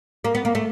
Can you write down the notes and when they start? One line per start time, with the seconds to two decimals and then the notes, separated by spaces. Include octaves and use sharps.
0.24 A#3
0.35 B3
0.45 A#3
0.55 A3